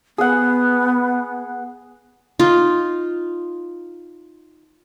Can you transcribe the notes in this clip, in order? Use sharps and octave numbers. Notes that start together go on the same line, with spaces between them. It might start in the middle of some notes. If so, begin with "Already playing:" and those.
B3 G#4 F#5
D#4 F4